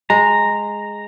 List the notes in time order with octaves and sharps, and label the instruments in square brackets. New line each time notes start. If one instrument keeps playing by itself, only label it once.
[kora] G#3 [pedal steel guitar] A#5